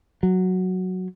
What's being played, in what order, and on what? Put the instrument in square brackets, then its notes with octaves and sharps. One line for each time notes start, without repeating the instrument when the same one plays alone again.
[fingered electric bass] F#3